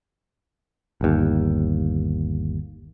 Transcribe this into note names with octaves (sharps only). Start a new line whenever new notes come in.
G1 D#2